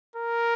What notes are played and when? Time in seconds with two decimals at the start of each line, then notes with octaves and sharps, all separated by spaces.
0.16 A#4